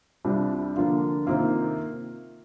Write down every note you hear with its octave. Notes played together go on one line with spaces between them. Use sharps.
C2 C3 G3 D4 F4
D3 F3 A#3 D4 F4
C3 D#3 A#3 F4